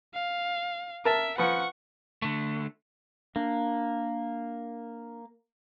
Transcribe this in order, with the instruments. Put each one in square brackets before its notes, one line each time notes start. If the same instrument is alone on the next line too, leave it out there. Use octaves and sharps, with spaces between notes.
[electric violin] F5
[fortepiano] A#4 A5 [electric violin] E5
[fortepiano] F3 B4 [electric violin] F#5 C#6
[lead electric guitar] D3 A3
[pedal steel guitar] A#3 [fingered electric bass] D4